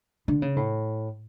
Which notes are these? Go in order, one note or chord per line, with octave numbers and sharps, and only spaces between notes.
D3
C#3
A2